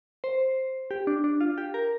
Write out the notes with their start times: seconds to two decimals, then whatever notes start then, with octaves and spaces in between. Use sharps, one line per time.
0.24 C5
0.91 G4
1.07 D4
1.24 D4
1.41 F4
1.58 G4
1.74 A#4